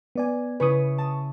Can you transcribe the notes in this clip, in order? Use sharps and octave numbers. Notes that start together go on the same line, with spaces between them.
B3 D5 G#5
C#3 E4 B4 C#6 D#6
A5